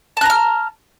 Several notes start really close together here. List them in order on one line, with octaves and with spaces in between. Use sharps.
A5 F#6 A#5 F6